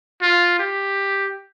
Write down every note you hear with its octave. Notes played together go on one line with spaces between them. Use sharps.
F4
G4